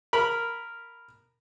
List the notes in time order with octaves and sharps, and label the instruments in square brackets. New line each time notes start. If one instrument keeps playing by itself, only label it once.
[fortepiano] A#4 B5